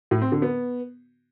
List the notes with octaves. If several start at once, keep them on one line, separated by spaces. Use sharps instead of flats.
A2
C4
D3
B3